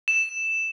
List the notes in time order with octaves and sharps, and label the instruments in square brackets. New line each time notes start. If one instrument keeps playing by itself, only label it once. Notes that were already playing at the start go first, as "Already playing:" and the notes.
[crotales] E7